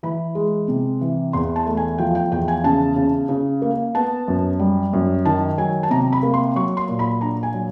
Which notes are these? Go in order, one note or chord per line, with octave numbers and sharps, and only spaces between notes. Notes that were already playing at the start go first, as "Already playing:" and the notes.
E3 B5
G#3
C3
E3
E2 C6
A5
A3
G#5
F3 G5
G5
E2 G5
G#5
C#3 A5
C#3
C#3
A#3
B3 A5
F#2
G3
F#2
D#3 A5
F#3 G#5
A5
C3 A#5
B5
A#3
C6
F#3 C#6
C6
A#2
B5
D4 A#5
G#5
F#3